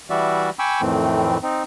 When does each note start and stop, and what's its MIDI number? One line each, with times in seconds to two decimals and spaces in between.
0.10 0.50 52
0.10 0.50 55
0.10 0.50 66
0.10 0.50 74
0.10 0.50 76
0.59 0.81 79
0.59 0.81 80
0.59 0.81 83
0.59 0.81 85
0.59 0.81 86
0.59 0.81 88
0.81 1.37 41
0.81 1.37 45
0.81 1.37 51
0.81 1.37 52
0.81 1.37 57
0.81 1.37 60
1.43 1.63 60
1.43 1.63 63